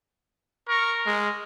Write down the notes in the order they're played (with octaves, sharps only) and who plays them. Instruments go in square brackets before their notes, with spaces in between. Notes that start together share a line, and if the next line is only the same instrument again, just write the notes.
[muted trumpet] A#4 [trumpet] C#6
[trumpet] G#3